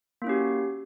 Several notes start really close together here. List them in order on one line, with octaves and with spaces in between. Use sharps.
A#3 E4 C#4 G4 F#4